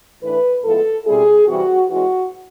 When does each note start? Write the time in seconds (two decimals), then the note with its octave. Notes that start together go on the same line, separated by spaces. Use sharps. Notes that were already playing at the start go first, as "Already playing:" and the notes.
0.22 A2 E3 A3 D4 B4
0.64 A2 F3 G#3 B3 E4 A4
1.05 B2 G3 C4 E4 G#4
1.48 C3 E3 G3 C4 F#4
1.89 E3 G#3 C#4 F#4